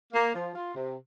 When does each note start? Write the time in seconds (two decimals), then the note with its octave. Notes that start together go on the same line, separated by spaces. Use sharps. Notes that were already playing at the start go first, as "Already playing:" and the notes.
0.13 A#3
0.35 F3
0.55 F4
0.75 C3